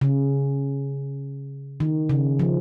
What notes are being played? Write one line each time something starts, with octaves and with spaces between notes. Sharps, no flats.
C#3
D#3
C#3
F3